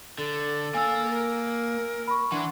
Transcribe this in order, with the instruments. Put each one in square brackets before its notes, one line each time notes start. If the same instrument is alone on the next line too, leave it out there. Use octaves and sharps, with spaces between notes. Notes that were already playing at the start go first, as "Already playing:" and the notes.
[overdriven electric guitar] D3 [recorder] A4
[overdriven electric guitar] A#3 F5 [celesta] G#5 E6
[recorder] A#4
[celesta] B5 C#6
[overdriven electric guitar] E3 [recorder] D4 [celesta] F#5 C6